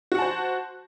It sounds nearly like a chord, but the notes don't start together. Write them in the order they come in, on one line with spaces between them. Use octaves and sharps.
F#4 F#5 A5 C5